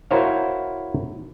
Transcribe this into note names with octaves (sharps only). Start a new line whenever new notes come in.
E4 F#4 A#4 C5 C#5 F5